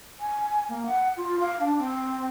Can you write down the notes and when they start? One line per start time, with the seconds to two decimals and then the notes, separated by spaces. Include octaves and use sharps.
0.20 G#5
0.69 A#3
0.86 F#5
1.17 F4
1.40 F5
1.60 D4
1.78 C4